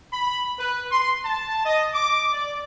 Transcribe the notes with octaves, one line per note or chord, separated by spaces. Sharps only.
B5
B4
C6
A5
D#5
D6
D5